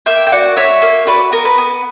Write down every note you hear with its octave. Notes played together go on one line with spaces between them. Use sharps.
A#3 E5 G5
G5
F#4 D5 F#5
F#4 C#5 E5
A#3
F#4 B4 D5
B3 A#4
B4
B3